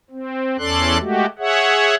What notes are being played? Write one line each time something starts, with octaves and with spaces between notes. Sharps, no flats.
C4
E2 C#4 A4 D5 C6 F#6
G#3 A3 F#4 G4
G#4 C#5 E5 F#5